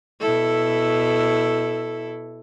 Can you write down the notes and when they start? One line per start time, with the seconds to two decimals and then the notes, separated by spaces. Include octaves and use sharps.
0.20 B2 E4 A4